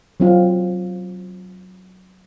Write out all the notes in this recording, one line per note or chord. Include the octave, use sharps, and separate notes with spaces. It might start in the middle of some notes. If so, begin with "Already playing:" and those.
F#3 C4 F4